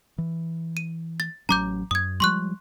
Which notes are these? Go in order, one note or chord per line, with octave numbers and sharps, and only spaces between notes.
E3
D#7
A6
A1 F#3 C#4 A#5 D6 G6
F#2 D#6 G#6
F3 G3 G#3 C6 C#6 F#6